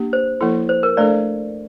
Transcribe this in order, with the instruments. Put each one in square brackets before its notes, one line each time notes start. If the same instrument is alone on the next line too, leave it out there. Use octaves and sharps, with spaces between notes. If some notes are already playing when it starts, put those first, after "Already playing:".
Already playing: [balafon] A#3 D4 G4
[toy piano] C5
[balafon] F3 A#3 E4 A4
[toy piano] C5
A#4
[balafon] A3 D4 A4 [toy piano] D5